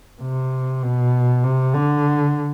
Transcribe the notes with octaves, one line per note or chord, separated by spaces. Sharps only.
C3
B2
C3
D3